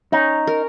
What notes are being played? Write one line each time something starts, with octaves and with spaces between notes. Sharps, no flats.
C#4 D#4
A#4